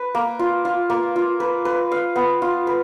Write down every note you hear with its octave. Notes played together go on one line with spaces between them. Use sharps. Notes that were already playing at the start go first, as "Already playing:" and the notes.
Already playing: B4
A#3
F4
F4
A#3
F4
B4
B4
F5
B3
F4
B4